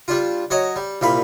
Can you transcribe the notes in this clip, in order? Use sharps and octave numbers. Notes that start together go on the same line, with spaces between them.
G3 D4 F4
F#3 C#5 D#5
G3
C2 A#2 F5 B5